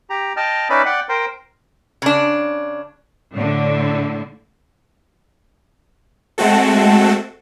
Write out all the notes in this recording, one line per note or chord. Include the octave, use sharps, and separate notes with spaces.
G4 A#5
D#5 G5 A5 F6
C#4 D#4 B4 D5 E5 B5
D5 F#5 G5 F#6
A#4 C5 G5
C#3 D4
A2 D3
G#3 A3 C4 F#4 A4